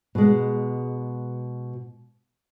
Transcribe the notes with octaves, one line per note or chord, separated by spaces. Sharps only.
B2 G#3